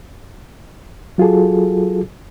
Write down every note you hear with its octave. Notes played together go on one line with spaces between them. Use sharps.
F#3 F4 F#4 G#4 A4